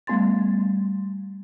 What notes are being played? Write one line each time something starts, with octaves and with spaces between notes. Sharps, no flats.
G3 A3 B3 G#5 C6 A6